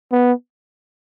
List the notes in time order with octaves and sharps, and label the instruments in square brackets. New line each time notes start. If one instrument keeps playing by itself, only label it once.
[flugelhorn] B3